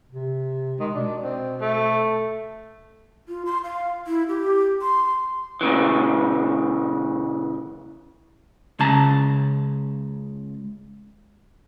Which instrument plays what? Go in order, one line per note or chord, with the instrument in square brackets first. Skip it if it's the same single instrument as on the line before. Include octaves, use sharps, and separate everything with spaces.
[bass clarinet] C3
[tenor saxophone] D#3 [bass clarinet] G#3
[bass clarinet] B2 [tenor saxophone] D4
[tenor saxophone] C4
A3
[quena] F4
C6
F5
E4
G4
C6
[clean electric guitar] A#2 C#3 E3
[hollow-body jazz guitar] C#2 C#3 A5 A#5